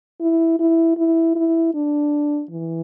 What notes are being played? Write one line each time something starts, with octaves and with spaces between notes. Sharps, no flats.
E4
E4
E4
E4
D4
E3